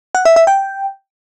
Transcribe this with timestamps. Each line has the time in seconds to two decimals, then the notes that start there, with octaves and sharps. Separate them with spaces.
0.15 F#5
0.25 E5
0.36 E5
0.47 G5